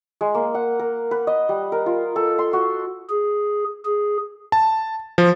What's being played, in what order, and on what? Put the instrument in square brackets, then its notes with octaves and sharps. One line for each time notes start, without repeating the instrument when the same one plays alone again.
[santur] G#3
A#3
F#5
A#4
B4
D#5
G3
A#4
F4
A4
C6
F#4
[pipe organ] G#4
G#4
[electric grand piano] A5
F3